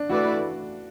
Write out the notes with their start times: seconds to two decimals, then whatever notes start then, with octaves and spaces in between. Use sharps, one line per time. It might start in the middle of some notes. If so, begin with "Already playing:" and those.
Already playing: D4
0.10 E3 A3 E4 F#4 B4 D5